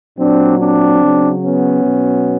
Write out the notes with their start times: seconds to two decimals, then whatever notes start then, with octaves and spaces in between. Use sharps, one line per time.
0.18 A#2 F#3 C4 D4
0.59 C4 D4
1.01 C#3 F#3
1.42 B3 C#4
1.83 B2 F#3